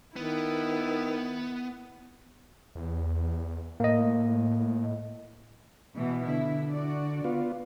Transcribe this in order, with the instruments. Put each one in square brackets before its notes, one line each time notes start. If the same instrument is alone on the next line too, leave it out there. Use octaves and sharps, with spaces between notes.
[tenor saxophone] D#3 [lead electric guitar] B3 [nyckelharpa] E4
[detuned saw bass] E2
[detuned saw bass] A2 [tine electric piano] A#3 D#5
[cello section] B2 E3
[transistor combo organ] D3 [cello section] E4
[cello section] F#4 D5
[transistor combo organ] B3 F4